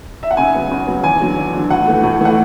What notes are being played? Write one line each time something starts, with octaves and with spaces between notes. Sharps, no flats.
E5
F#5
C#3 G#5
F#3 B3
C#3
F#3 B3
E2 G#5
D3 F#3
E2
D3 F#3
A2 F#5
E3 A3
A2
E3 A3 F#5